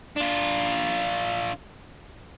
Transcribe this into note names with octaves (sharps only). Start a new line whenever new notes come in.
D4 F4